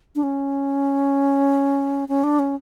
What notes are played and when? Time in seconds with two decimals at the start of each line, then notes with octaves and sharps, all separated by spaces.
0.16 D4
0.23 C#4
2.09 C#4
2.24 D4
2.39 C#4